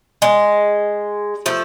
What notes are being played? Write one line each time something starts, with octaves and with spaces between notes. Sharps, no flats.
G#3
F3 A3